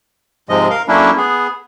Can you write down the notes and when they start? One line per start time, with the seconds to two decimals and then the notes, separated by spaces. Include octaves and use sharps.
0.49 G#2 C3 F3 G#3 D#5
0.70 A#4 F5
0.88 F#3 A3 A#3 C#4 D4 E4
1.17 B3 G#4